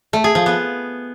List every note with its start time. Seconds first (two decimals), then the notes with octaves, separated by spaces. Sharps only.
0.13 A3
0.24 G#4
0.35 F3
0.46 B3